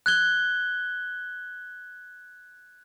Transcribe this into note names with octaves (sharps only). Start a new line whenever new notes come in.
F#6 G#6 G7